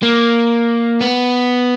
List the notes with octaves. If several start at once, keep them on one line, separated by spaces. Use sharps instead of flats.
A#3
B3